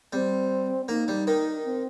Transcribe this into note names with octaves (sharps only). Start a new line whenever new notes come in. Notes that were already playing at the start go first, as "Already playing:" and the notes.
G3 C4
A#3 D#4
G3
D#3
C4